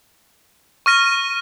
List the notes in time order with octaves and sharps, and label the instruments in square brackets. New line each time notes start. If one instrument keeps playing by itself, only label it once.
[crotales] C#6 F6 A#6 D#7